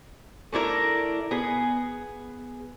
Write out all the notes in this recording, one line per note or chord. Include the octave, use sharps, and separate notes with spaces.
A3 D4 E4 A#4
B3 G#4